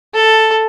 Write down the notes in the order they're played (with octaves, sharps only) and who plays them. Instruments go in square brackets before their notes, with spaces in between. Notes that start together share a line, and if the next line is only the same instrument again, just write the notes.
[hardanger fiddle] A4